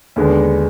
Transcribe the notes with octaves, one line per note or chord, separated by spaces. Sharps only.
D#2 D3 G#3 B3 D4